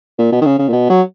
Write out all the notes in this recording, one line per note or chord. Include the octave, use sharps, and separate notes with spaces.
A#2
B2
D#3
C#3
C#3
A#2
B2
F#3